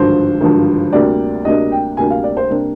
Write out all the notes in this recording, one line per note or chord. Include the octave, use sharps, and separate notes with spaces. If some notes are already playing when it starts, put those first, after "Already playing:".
Already playing: G#1 G2 D3 F3 C5
G#1 G2 D3 F3
D2 C3 G3 A#3 D4 D5
D2 C3 G3 A#3 D4 D#5
G5
D2 C3 G3 A#3 D4 G#5
F5
D5
C5
C3 G3 A#3 D4